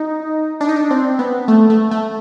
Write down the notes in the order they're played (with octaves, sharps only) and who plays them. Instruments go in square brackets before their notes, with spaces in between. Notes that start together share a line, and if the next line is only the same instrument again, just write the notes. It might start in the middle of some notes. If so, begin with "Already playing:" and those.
Already playing: [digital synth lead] D#4
D4
D#4
D4
C4
B3
A3
A3
A3